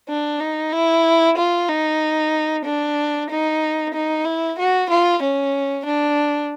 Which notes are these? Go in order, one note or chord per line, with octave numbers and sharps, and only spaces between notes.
D4
D#4
E4
F4
D#4
D4
D#4
D#4
E4
F#4
F4
C#4
D4